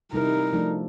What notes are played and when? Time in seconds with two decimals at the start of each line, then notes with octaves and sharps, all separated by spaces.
0.13 C3 G3 D#4 E4 A#4
0.53 F3 A3 D4